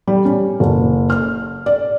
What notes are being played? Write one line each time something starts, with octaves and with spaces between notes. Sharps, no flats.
G3
C#4
F#1
F6
D5